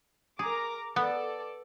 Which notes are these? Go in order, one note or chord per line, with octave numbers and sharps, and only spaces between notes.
G#4 A#4 A#5 D6
B3 A4 D5